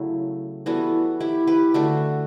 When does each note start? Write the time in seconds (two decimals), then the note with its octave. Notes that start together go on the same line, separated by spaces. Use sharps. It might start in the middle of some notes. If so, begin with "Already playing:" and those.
Already playing: C#3 F#3 A3 E4
0.66 E3 G3 B3 F#4 A4
1.20 E4 G4
1.47 G4 B4
1.74 D3 A3 F#4 A4